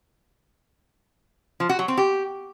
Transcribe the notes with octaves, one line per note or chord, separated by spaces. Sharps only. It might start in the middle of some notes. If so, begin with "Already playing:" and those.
F3
F#4
F#3
C4
G4